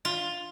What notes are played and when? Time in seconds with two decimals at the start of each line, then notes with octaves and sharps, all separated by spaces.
0.05 F4